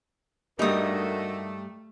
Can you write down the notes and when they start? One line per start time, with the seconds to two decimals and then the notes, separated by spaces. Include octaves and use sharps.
0.59 G2 G3 A3 D#4 F#4 A#4 D#5 D#6